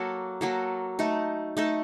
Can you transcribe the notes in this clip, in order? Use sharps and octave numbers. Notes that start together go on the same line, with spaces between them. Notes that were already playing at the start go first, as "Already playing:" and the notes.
Already playing: F#3 A#3 F#4 A4
F#3 A#3 F#4 A4
A3 D#4 A4
A3 D#4 A4